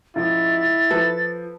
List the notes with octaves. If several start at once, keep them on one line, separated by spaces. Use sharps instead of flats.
C#2 G#2 F3 E4 A6
F3 A4 B4